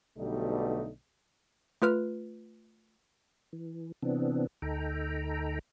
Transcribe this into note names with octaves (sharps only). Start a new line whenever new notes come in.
B1 B2 D3 G3 A3 D#4
A3 F4 B4 F6
E3
C3 E3 B3 C4 D4
D2 D#4 A4 G5 A#5